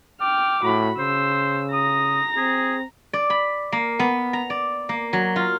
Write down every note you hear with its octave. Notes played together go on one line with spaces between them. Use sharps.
G5 D6 F6
A2 F#4 B5
C#3 C5 E6
A#5 D#6 A#6
C4 G#4
D5
B5
A#3
B3
A#5
D5
A#3
F#3
F4